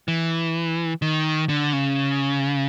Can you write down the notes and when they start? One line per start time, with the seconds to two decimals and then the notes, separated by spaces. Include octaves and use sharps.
0.08 E3
1.02 D#3
1.49 D3
1.73 C#3